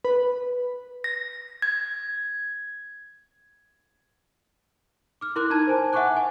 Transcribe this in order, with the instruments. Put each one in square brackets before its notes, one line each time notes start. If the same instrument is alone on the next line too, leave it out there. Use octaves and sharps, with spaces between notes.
[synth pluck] B4
[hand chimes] A#6
G#6
[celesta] D6 F6
E4 A#4 C6 D6 F#6
D#4 A#4 A5 A#5 G#6 D#7
C5 G#5 A5
E5 F#5 G#5 C#6 D6 F#6
G#5